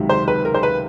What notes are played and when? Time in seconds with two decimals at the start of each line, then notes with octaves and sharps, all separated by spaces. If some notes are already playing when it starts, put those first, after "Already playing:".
Already playing: C#2 C3 D#3 F#3
0.09 C5
0.28 B4
0.45 A#4
0.54 C5
0.63 B4